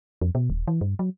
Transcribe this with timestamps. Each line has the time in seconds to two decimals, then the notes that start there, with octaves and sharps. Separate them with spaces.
0.22 F2
0.35 B2
0.50 D#1
0.68 E3
0.81 G2
0.99 F#3